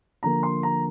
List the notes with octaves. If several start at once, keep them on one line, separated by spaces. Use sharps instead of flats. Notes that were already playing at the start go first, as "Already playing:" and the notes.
D3 F3 A#3 A#5
C6
A#5